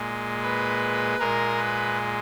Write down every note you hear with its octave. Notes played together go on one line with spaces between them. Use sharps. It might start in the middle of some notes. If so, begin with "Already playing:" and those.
Already playing: A#2 G#3
B4
A#2 G#3 A#4
B4